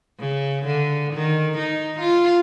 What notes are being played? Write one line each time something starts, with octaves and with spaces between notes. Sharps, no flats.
C#3
D3
D#3
D#4
F4